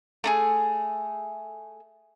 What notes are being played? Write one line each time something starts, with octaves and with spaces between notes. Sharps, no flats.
A3 D#4 G#4